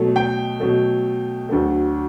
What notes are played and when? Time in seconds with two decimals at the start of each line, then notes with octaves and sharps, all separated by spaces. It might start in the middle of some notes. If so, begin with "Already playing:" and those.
Already playing: B2 F#3 A3
0.16 G5
0.60 B2 F#3 A3
1.49 D2 D3 F#3 A3